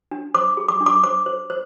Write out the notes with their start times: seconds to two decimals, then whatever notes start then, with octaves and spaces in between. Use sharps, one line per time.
0.11 D4
0.34 C5 D6
0.57 G#4
0.68 D6
0.81 D4
0.86 D6
1.04 C5 D6
1.26 C5
1.50 C5